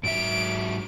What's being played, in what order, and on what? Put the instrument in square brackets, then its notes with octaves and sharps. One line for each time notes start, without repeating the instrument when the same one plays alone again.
[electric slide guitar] G#2 F#3 E5 [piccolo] D7